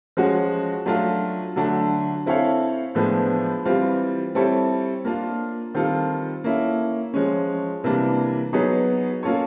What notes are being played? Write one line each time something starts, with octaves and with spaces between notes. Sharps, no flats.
F3 G#3 C#4 F#4
F#3 A3 D4 F4
D3 F#3 A3 D4
C4 E4 A4 C#5 F5
A2 F3 G#3 B3 D4
E3 G3 C4 F4
G3 C4 E4 A4 C#5
A#3 D4 F4
D#3 G3 C4 F4 A4
A#3 C#4 E4 A4
F3 G#3 C#4
C3 E3 G3 A#3 D4
F#3 B3 D#4 G#4 C#5
A#3 C#4 F4 A4 C#5